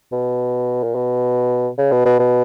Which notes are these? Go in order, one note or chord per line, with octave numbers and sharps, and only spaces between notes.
B2
A#2
B2
C#3
B2
B2
B2